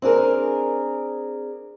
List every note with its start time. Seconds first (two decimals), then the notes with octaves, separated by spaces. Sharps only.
0.02 C4 D4 G#4 A#4